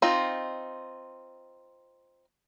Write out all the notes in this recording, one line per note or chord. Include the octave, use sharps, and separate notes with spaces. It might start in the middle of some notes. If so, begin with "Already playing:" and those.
C4 D#4 F4